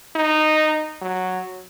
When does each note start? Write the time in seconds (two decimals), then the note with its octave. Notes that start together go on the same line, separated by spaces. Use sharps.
0.16 D#4
1.01 F#3